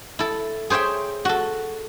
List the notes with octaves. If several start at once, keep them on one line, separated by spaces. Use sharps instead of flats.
E4 A4
G#4 C5 C#5 E5 G5
F#4 A4